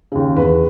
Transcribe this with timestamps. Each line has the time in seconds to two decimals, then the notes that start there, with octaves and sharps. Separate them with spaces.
0.12 D#2 C#3
0.36 E2 B4